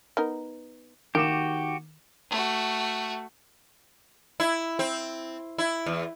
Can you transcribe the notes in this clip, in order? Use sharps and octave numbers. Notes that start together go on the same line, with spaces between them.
B3 D#4 A#4
D#3 A#3 F#4 G4 D6 E7
A3 F#4
E4
C4
E4
E2